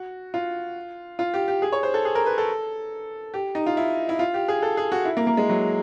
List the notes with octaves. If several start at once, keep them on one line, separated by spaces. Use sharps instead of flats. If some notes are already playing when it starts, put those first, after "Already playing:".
Already playing: F#4
F4
F4
G4
G4
G#4
C#5
C5
A4
G#4
A#4
B4
A4
G4
D#4
F4
E4
E4
F4
G4
G#4
A4
G#4
F#4
E4
A#3
A#3
G#3
F#3